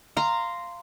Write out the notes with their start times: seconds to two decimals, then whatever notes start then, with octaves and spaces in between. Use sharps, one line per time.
0.17 F5 A#5 C6